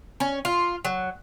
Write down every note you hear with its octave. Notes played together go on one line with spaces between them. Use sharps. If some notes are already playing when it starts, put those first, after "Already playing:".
C#4
F4
F#3